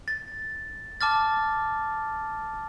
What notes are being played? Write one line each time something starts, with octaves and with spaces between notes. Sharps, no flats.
A6
A5 D6 F6 A6